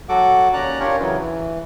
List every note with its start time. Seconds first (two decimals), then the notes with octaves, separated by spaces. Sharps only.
0.09 F#3 F#4 A4 F#5 D6
0.54 D#2 C#4 D5 A#5 F#6
0.80 C#4 D4 F4 G4 A#4 C#5
1.00 C#3 E3 F#3
1.19 E3